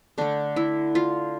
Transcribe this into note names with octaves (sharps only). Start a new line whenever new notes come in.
D3 A3 D4
E4
F4